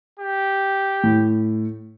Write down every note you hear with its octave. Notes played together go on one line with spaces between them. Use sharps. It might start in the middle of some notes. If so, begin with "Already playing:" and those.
G4
A2